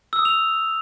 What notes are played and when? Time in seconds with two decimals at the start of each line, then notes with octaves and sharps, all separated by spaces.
0.13 E6
0.19 D#6
0.25 F7